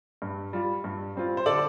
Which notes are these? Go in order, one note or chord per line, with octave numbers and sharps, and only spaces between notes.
G2
G3 F4
G2
G3 C4 F4
C5
D3 A4 D5